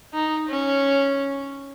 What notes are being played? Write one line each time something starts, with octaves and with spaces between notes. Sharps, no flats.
D#4
C#4